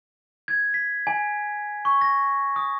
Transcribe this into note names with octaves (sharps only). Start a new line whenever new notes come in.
G#6
B6
G#5
C#6
A#6
D#6